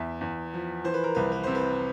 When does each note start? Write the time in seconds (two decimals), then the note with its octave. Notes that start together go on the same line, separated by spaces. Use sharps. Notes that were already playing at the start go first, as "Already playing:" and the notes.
Already playing: E2 E5
0.21 E2
0.54 F3
0.84 E3 C5
0.94 B4
1.04 A#4
1.15 C2 B4
1.32 B4
1.43 C3 C5
1.55 B4